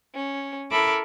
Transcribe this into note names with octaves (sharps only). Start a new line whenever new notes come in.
C#4
E4 A4 A#4 E5 B5 D6